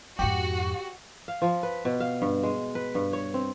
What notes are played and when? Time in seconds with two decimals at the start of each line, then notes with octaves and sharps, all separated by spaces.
0.19 F2 G#2 F#4 G4
1.28 F5
1.42 F3
1.63 B4
1.85 B2
2.00 F5
2.22 G2
2.43 G#3
2.75 B4
2.95 G2
3.13 C#5
3.34 C4